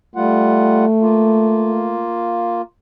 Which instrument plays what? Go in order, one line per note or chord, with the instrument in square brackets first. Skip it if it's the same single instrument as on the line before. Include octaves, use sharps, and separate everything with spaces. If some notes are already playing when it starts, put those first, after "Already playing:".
[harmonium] G3 F4 F#5 [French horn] A3
[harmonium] A#3 F4